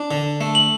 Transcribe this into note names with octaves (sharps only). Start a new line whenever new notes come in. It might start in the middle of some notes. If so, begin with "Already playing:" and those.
Already playing: D4
D3
A3
F#7